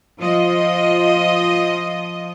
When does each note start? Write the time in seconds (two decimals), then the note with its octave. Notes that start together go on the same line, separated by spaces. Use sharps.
0.19 F3 D#5